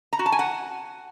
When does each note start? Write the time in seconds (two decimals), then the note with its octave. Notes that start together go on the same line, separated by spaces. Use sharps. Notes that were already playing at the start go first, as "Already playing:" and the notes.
0.13 A#5
0.19 F#4
0.26 A5
0.32 G#5
0.39 F#5